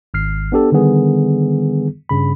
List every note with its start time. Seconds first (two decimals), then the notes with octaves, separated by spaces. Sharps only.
0.14 G#1 F6 C7
0.52 B3 D4 G4 A4
0.72 D3 D#3 G3 B3 G#4
2.09 G2 C#3 B5